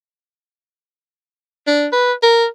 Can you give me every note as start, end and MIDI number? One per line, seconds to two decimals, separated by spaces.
1.67 1.87 62
1.92 2.13 71
2.23 2.46 70